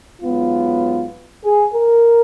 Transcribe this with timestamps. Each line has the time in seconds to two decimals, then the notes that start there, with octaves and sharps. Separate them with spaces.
0.21 G#2 F#3 B3 F4
1.44 G#4
1.74 A#4